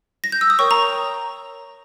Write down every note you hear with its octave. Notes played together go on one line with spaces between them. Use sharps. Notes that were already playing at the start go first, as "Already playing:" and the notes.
A#6
G6
E6
D#6
A#4 C#5 G5 C#6
A#5